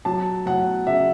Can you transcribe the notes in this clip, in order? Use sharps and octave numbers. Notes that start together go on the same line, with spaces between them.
F#3 A5
F#3 F#5
C#3 E5